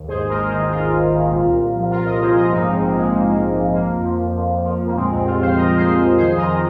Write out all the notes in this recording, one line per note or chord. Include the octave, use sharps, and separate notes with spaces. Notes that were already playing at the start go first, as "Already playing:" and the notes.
Already playing: D#2
G#2 G#4 C5
G#1
A#4 D#5
G#1
D#3 G#4 C5
G#2 F4 A#4
G#1
G#1
D#3
A#2
C2
C2
F3
A#2 F4 A#4
C2 A#4 D#5
C2 G#4 C5
F3 A#4 D#5
G#2 A#3 D#4
A#1 G#3 C4
A#1 A#3
F3 G#3
G#2 A#3
A#1 A#3
A#1
F3 G#3
F3 A#3
F2
F3
F2
F3
F2
F3
F2
A#3
A#2 G#3 C4
C2 G#3 C4
C2 C4 F4
F3 C5 F5
A#2 A#4 D#5
A#4
C2
G#4 C5
C2
F3
D#3 G#4 C5
F2 A#4 D#5
D#3